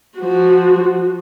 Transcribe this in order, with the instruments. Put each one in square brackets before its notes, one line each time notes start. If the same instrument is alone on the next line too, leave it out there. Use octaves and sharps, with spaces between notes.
[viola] F3 F#4